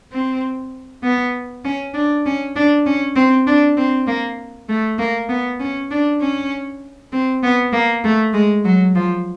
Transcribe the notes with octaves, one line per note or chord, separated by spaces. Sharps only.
C4
B3
C#4
D4
C#4
D4
C#4
C4
D4
C4
A#3
A3
A#3
B3
C#4
D4
C#4
C4
B3
A#3
A3
G#3
F#3
F3